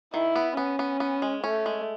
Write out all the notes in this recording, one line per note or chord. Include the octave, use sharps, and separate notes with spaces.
D#3 E4
B3
B3 C#4
B3
B3
G#3
A3 C#4
G#3